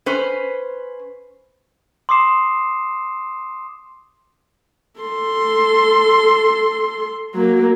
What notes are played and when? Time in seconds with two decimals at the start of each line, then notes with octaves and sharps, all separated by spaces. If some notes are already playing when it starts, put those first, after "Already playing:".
0.06 C#4 B4 C5
2.09 C6 D6 D#6 C7 E7
5.01 A4 C6
7.35 F#3 A#3